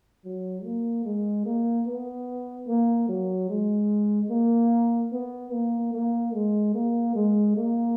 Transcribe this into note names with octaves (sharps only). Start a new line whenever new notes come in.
F#3
A#3
G#3
A#3
B3
A#3
F#3
G#3
A#3
B3
A#3
A#3
G#3
A#3
G#3
A#3